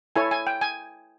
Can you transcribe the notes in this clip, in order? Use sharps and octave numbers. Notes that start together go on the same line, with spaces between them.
E4 A4 C#5 G#5
G#5
G5
G#5